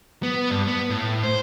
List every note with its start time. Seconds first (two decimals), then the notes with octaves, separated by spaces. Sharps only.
0.23 B3
0.51 G2
0.67 B3
0.90 A2
1.23 C5